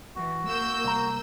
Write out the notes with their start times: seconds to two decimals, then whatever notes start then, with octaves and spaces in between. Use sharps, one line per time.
0.15 E3 F#4
0.48 A#3 E6 G6
0.84 C2 A#5